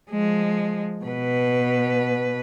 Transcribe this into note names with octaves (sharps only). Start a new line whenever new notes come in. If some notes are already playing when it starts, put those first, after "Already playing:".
F3 G#3
B2 B4